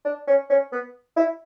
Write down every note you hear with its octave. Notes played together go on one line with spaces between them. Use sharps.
D4
C#4
C#4
B3
E4